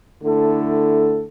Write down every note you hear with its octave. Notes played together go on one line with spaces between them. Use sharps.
D3 A3 E4 A4